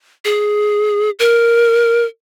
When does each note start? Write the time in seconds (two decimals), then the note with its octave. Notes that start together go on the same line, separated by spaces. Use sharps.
0.25 G#4
1.19 A#4